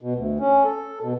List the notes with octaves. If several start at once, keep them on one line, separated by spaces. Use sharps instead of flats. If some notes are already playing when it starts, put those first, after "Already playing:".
B2
D2
C#4
A4
B2